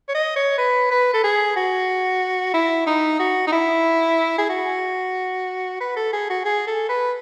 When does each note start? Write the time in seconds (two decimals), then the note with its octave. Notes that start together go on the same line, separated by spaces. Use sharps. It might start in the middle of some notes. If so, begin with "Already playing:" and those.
0.09 C#5
0.15 D#5
0.36 C#5
0.58 B4
0.91 B4
1.14 A4
1.24 G#4
1.56 F#4
2.54 E4
2.87 D#4
3.19 F#4
3.47 D#4
3.52 E4
4.38 G#4
4.49 F#4
5.80 B4
5.96 A4
6.13 G#4
6.29 F#4
6.45 G#4
6.67 A4
6.89 B4